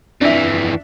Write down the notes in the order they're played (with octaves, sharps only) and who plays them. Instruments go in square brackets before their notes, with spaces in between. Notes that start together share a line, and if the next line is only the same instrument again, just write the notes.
[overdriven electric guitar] F2 E3 [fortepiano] D4 E5